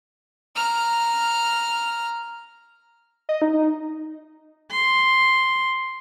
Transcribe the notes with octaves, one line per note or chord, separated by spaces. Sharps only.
A#5 F6
D#5
D#4
C6